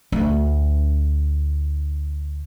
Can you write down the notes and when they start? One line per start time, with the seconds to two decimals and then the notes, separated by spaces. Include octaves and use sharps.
0.12 D2 D4